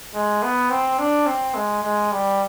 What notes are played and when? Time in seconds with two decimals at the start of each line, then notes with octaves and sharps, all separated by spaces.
0.15 G#3
0.43 B3
0.70 C4
0.99 D4
1.27 C4
1.55 G#3
1.83 G#3
2.12 G3